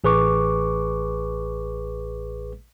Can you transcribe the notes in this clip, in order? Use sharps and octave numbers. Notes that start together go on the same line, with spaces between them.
A1 G#4 B4 C#6 D6